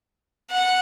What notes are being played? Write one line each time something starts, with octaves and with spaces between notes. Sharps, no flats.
F#5